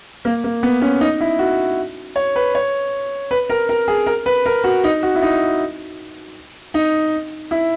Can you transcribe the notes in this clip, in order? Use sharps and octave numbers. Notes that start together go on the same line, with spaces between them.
A#3
A#3
B3
C#4
D#4
E4
F#4
C#5
B4
C#5
B4
A#4
A#4
G#4
A#4
B4
A#4
F#4
D#4
F#4
E4
D#4
D#4
E4